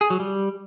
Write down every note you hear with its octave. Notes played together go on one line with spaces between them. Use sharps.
G#4
F#3
G3